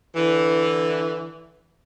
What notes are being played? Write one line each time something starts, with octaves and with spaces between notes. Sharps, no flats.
D3 E3